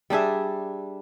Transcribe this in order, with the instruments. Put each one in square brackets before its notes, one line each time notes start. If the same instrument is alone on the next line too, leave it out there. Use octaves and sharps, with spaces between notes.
[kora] G3 D4 G#4 E5